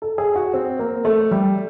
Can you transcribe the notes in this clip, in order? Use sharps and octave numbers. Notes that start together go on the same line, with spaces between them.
A4
G#4
F#4
C4
A#3
A3
G3